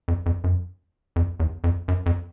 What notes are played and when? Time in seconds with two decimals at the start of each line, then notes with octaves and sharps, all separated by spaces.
0.08 F2
0.26 F2
0.44 F#2
1.16 F2
1.40 E2
1.64 F2
1.88 F#2
2.06 F2